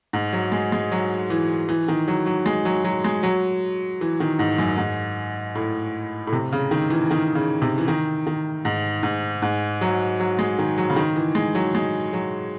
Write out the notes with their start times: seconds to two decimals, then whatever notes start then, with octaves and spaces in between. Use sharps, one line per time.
0.13 G#2
0.33 F#3
0.52 G#3
0.72 G#3
0.92 F#3
1.30 E3
1.69 E3
1.88 D#3
2.08 F#3
2.26 F#3
2.46 G#3
2.65 F#3
2.84 F#3
3.04 G#3
3.23 F#3
4.01 E3
4.20 D#3
4.39 G#2
4.58 F#2
4.77 G#2
5.55 A2
6.27 A2
6.33 C3
6.53 C#3
6.71 D#3
6.90 E3
7.11 D#3
7.35 C#3
7.62 C3
7.78 E3
7.88 D#3
8.27 D#3
8.65 G#2
9.03 G#2
9.42 G#2
9.81 F#3
10.20 F#3
10.39 G#3
10.59 D#3
10.78 F#3
10.90 C#3
10.96 D#3
11.16 E3
11.35 G#3
11.55 F#3
11.75 G#3
12.13 F#3